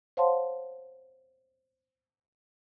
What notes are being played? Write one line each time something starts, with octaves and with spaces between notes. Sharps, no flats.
C5 C#5 F5 F#5 A5 C6